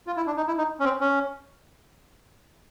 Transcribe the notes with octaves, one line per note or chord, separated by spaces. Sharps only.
F4
E4
D4
D#4
E4
D#4
C#4
C4
C#4